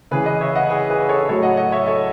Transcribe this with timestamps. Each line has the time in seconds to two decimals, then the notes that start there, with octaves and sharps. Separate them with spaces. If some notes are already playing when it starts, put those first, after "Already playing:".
0.11 C#3 E3 G#4 B4
0.26 B4 D#5
0.41 C#5 E5
0.55 D#5 F#5
0.70 G#4 B4
0.90 G#4 B4
1.09 A4 C#5
1.28 A2 F#3 A4 C#5
1.43 D#5 F#5
1.57 D#5 F#5
1.72 C#5 E5
1.86 A4 C#5